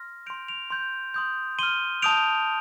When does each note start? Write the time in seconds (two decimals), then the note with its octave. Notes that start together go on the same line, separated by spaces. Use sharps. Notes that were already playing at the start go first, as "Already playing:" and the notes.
Already playing: C6 F6 A#6
0.26 C6 G6 D7 F7
0.48 D7 F7
0.70 C6 G6
1.14 C6 D#6 G6
1.59 C6 F6 D#7 G7
2.02 A5 D#6 G6 D7 F7